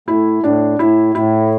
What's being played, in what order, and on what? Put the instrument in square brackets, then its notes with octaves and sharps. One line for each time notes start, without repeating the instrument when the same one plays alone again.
[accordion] A2 [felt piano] E4
[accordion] A2 [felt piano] D4
[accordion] A2 [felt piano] E4
[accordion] A2 [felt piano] E4